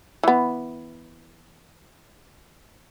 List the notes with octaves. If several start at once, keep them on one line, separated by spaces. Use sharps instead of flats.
E3 B3